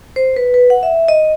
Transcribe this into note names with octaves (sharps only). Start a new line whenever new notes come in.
C5
B4
B4
F#5
E5
D#5